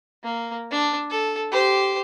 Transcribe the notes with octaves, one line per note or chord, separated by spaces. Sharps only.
A#3
D4
A4
G4 C5